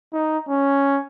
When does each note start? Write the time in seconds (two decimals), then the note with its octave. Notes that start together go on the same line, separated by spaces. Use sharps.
0.13 D#4
0.49 C#4